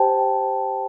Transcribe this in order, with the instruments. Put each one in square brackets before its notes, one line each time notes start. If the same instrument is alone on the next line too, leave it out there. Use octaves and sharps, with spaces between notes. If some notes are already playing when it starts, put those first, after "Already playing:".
Already playing: [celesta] G4 C5 G5 A5